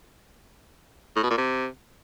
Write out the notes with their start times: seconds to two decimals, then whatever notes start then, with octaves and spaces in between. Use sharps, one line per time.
1.16 A2
1.23 B2
1.30 A#2
1.38 C3